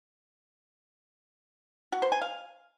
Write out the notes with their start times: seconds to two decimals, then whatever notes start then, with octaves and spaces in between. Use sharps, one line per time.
1.92 F#4
2.02 C5
2.12 G#5
2.22 F5